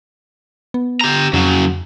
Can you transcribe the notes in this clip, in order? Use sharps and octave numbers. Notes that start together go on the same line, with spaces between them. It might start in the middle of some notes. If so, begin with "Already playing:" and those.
B3
G4 A#5
F2 C#3 F#3